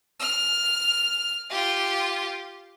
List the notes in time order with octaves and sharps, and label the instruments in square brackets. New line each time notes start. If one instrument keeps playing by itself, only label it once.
[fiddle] F6
F4 G4